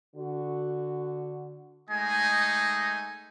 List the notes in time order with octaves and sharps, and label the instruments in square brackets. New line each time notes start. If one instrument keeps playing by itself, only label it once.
[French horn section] D3 F#4
[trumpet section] G#3 A3 D#4 D#5 G#5